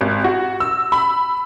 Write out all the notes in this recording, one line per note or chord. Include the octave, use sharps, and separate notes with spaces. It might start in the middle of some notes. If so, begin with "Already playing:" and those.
G#1
F#4
E6
B5